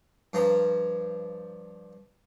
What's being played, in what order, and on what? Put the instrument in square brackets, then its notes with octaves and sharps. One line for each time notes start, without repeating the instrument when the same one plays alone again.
[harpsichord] G2 F3 A#5